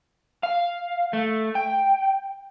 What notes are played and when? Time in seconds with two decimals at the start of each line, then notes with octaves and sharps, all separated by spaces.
0.43 F5
1.13 A3
1.55 G5